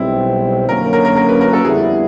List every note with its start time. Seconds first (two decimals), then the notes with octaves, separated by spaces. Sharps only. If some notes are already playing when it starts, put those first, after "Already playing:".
Already playing: B1 B2 G3 C4 E4
0.68 F#2 D3 F#3 A#3 C#4 A#4
0.93 A#4
1.05 A#4
1.16 A#4
1.29 B4
1.41 A#4
1.53 A4
1.65 F2 D3 G3 B3 E4 G#4